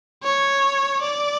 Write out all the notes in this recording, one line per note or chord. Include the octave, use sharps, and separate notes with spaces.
C#5
D5